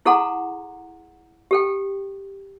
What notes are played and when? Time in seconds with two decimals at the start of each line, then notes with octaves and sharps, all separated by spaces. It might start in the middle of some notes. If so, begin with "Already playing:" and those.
0.06 E4 G#4 A4 F#5 A#5 C6
1.51 G4 A4 G5